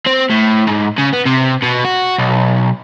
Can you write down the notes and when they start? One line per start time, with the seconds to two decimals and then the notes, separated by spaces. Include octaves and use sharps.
0.07 C4
0.30 A2
0.67 G#2
0.98 C#3
1.13 B3
1.26 C3
1.63 B2
1.85 F#4
2.18 B1